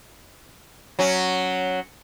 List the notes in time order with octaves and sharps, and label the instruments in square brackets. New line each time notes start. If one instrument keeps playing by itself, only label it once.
[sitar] F#3 C#4